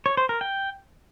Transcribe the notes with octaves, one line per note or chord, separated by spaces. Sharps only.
C#5
C5
A#4
G5